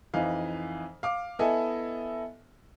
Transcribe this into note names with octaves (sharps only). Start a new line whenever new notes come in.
F2 E3 D#4 F5
F5 D6
B3 E4 A4 D#5 E5 G#5